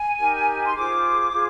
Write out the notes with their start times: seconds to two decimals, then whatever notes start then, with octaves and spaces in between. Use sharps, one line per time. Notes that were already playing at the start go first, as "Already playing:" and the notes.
Already playing: G#5
0.18 D#4 G4 A#4
0.66 C6
0.75 F4 G#4 C5 D6
1.31 F4 G#4 C5